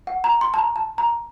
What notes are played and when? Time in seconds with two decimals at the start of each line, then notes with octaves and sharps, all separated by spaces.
0.07 F#5
0.24 A#5
0.41 C6
0.54 A5
0.58 A#5
0.76 A5
0.98 A#5